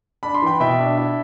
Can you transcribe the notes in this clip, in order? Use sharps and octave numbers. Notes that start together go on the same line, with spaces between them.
D4 B5
C6
E3 G5 B5
B2 E5 G5
D4
E4